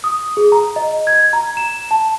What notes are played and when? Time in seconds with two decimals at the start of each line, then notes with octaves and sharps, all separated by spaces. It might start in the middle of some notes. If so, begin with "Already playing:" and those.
0.04 D#6
0.37 G#4
0.52 A#5
0.76 D#5
1.07 G#6
1.33 A#5
1.57 E7
1.91 A5